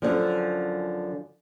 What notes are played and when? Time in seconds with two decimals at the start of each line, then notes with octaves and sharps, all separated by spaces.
0.02 F#2 B2 D3 F3